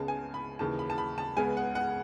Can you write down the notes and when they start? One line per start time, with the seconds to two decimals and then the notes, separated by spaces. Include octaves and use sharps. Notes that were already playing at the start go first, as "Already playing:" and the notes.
Already playing: C#2 C#3 G#3 B3 A5
0.08 G#5
0.34 B5
0.59 D#2 C#3 E3 A5
0.79 B5
0.90 A5
0.98 B5
1.18 A5
1.37 C#2 C#3 G#3 B3 G#5
1.57 F#5
1.75 F#5